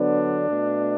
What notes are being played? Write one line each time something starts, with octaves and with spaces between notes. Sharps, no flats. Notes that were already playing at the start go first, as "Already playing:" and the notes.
Already playing: D3 F#3 B3 D4
B2 A3